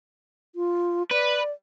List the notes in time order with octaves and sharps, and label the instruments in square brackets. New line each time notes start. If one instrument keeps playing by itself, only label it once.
[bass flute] F4
[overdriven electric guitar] B4 [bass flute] D5